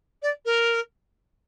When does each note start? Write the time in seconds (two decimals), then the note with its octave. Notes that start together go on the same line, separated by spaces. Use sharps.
0.22 D5
0.45 A#4